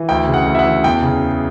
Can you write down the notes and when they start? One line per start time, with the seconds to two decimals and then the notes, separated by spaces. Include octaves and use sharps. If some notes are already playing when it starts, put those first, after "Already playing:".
Already playing: E3
0.09 D2 G5
0.27 C#3
0.34 F#5
0.46 D2
0.55 E5
0.59 F#5
0.65 E3
0.84 E2 G5
1.03 C#3